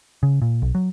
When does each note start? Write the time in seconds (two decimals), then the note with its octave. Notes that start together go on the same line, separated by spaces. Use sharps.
0.23 C#3
0.42 A#2
0.62 B1
0.75 F#3